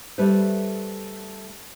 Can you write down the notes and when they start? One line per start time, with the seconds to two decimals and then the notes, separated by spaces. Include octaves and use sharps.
0.18 G3 A3 B4 C5